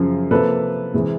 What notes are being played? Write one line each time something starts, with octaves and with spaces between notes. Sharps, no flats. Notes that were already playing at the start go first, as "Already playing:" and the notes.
Already playing: F#2 C#3 F3
C3 F3 A#3 A4 B4
C3 E3 G#3